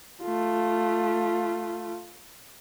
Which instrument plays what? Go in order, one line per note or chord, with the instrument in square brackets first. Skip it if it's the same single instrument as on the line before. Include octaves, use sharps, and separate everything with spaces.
[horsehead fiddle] A3 F4